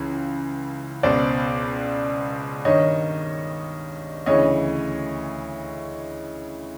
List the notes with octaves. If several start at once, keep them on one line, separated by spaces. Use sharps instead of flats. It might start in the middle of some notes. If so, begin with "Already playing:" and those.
Already playing: C#2 C#3 E3
C#2 B2 C5 D5
G2 D#3 C#5 D#5
D2 C#3 E3 C#5 D#5